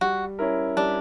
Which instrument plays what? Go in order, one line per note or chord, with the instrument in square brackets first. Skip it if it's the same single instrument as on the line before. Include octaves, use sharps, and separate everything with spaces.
[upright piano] G3 [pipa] F#4
[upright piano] C#4 E4 A#4
[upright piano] G3 [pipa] D4